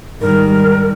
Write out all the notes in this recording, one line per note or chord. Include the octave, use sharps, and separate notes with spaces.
G#2 D#3 G3 A#4